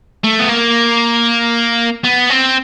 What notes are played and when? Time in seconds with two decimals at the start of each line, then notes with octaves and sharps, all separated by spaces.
0.24 A3
0.39 B3
0.49 A#3
2.05 B3
2.30 C4